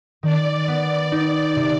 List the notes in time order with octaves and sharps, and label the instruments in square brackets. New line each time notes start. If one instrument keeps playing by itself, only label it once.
[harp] D#3 [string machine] D5
[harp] B3
D#4
C3